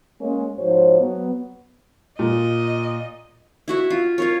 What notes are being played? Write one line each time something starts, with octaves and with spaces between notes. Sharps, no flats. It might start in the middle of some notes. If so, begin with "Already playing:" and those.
G#3 A#3 C#4
G#2 F3 F#4 C5 C#5
F#3 B3
A#2 D#5
E4 F#4 E5
F4
F4 A#4 C#5